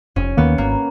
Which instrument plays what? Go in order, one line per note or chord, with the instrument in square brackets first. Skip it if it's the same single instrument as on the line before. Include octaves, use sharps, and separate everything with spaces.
[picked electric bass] F1 [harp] C#4
[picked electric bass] D#2 D#3 A#3 [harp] B3
[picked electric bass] G#1 [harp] A#3